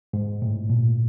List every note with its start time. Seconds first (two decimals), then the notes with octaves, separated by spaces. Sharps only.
0.13 G#2
0.42 A2
0.70 A#2